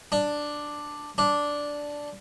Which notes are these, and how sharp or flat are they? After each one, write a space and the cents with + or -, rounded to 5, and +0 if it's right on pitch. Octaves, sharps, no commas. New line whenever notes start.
D4 +5
D4 -5